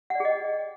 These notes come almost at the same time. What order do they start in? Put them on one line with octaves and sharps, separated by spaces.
F#5 D5 G#4 D#5 G5